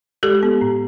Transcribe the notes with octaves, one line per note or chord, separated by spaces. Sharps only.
G#3 G4 A4
B3
A2